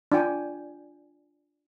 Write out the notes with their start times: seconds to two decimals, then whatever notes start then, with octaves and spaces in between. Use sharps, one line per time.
0.12 D4 F4 G5 G#5